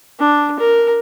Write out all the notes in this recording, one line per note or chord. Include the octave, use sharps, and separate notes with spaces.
D4
A#4